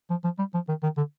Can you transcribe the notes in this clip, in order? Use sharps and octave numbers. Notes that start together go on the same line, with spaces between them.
F3
F3
G3
F3
D#3
D#3
D3